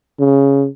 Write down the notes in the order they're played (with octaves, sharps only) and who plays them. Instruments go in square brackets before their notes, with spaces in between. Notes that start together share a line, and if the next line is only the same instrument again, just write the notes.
[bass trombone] C#3